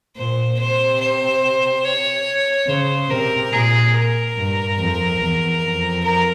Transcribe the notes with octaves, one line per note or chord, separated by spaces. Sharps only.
A#2 C5
C3 C5
C5
C#5
C#3 C5
C3 A#4
A#2 G#4
A#4
G2
F2
E2
F2
A#4